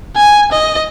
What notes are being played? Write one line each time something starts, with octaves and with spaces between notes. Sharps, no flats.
G#5
D#5